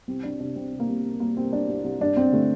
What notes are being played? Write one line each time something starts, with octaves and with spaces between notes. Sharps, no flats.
C2 C4
C2 D4
C3 D4
C2 C4
C3
A#3
C2
C3
G3 A#3
C3 C4
C2 D4
C2
C2
G2 D4
G2 C4
D3 A3